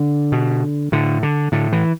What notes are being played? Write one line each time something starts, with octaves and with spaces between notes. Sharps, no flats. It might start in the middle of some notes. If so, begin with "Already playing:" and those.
Already playing: D3
B2
A2 D3
D3
A2 D3
E3